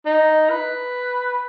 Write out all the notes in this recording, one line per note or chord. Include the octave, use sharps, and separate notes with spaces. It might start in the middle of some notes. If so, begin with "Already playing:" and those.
D#4
B4